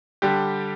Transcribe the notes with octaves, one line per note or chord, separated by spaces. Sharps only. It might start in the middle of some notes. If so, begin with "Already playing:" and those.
D3 G3 G4